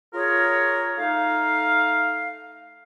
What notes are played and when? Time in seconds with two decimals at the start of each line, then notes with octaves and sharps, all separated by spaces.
0.14 F4 G#4 A#4 C#5
0.97 A3 D#4 F5